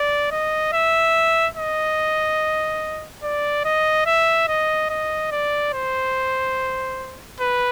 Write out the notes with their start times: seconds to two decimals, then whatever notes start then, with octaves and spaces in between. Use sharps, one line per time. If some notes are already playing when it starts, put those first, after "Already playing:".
Already playing: D5
0.31 D#5
0.73 E5
1.56 D#5
3.23 D5
3.65 D#5
4.06 E5
4.48 D#5
4.90 D#5
5.31 D5
5.73 C5
7.40 B4